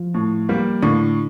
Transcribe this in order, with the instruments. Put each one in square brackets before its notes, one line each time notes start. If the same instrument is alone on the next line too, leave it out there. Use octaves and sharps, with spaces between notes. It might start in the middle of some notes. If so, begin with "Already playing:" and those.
Already playing: [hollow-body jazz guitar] F3
[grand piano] A2
G3 A#3
[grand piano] A2 [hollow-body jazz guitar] D3